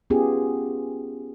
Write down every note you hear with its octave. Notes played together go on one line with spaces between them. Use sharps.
B3 C#4 F4 G4 G#4